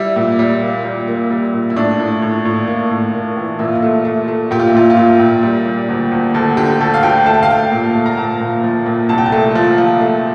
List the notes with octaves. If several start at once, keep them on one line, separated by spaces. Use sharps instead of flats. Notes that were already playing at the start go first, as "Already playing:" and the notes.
Already playing: G3 E4
A#2
G3
A#3
G3
A#3
G3
A#2
E4
A2 D4
A2
A2
A2
A#3
A2
A#3
E3
A#2 E4
F4
E4
A3
A3
A3
A#2 G4
F4
E4
A#2 F4
F4
A#2 E4
A#2
G3 G4
G3
D2
D2
D2 A4
D3 G4
D2 A4
F5
D2 G5
A3 A5
G5
F5
A3 G5
A#2
A3
A#5
A#2 A5
A#2
F3
A#2
C2 A5
G5
A5
A3
F3
F3
A3